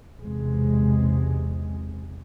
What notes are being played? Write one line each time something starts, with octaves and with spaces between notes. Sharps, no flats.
B1 E2 C3 G#3